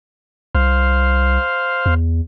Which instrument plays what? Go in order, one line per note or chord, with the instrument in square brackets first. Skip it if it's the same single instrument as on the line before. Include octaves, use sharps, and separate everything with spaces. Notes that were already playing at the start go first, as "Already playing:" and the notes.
[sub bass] C2 [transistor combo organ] C5 F5
[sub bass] E2